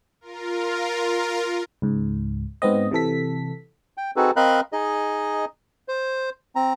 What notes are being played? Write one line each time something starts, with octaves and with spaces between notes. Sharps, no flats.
F4 A#4
C#2 G#2
G#2 B3 C4 D#5
C3 E3 A4 B6
G5
C4 D#4 F#4 G#4 A4 B4
C4 A#4 D#5 F5 B5 F#6
D#4 G#4 D#5
C5
C4 A#5